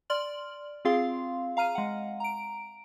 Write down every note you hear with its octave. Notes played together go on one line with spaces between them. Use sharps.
D5 C6 F6 F#7
C4 F4 G#4 F5 C6
F5 A#5 F6 D#7
G#3 F#5
A#5 D7